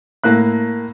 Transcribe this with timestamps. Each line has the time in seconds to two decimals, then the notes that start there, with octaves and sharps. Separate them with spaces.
0.24 A2 A#3 E4 F#6